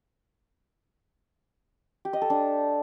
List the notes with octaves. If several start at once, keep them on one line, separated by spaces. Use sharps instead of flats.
G4
D#5
A4
D4